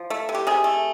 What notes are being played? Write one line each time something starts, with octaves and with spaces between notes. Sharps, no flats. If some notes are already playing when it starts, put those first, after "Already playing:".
Already playing: F3
A3
C3
G4
C3 G#4
A3